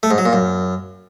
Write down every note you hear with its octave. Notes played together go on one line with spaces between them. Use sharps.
A3
G#2
F#3
A#2
F#2